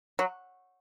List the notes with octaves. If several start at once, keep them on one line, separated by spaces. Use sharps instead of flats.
F#3